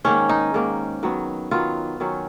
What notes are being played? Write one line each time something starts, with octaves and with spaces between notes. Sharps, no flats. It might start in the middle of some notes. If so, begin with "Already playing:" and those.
G#2 D#3 A#3 C#4
D#4
G#2 D#3 A#3
D#3 F#3 B3
D#3 F#3 B3 F4
D#3 F#3 C#4